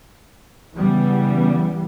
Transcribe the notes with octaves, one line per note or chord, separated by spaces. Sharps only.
C#3 E3 G3 B3